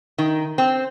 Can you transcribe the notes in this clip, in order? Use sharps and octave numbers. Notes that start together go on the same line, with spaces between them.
D#3
C4